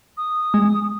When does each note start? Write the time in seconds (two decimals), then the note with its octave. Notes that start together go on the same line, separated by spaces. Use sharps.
0.17 D#6
0.54 G#3